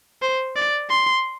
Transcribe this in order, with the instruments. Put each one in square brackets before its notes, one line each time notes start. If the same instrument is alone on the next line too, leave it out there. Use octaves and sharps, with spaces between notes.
[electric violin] C5
D5
C6